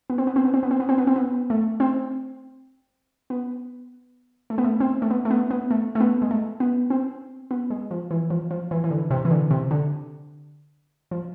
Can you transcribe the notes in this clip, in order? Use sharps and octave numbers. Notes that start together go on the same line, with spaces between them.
B3
C4
B3
C4
B3
C4
B3
C4
B3
C4
B3
C4
B3
A3
C4
B3
A3
B3
A3
C4
A3
B3
A3
B3
B3
A3
A3
B3
G#3
A3
B3
C4
B3
G#3
F3
E3
F3
F3
E3
E3
D3
C3
E3
D3
C3
D3
F3